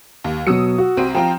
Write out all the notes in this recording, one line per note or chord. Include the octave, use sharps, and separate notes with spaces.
D#2
B2 F#3 D#6 E6 C#7
F#4
C2 C4 D#7
F3 C4 F4 G5 A#5